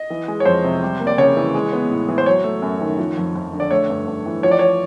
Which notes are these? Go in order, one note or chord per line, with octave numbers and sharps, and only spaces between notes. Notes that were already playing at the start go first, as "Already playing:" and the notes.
Already playing: D#5
E3
G#3
C#5
F2 C5
C3
G3
A#3
D5
C#3 C#5
E3
G#3
B3
A2
E3
C5
F#3 C#5
A3
F#2
D#3
F3
F2
F2
D3
D5
A3 C#5
G2
G2
E3
F3 C#5
D5
C#5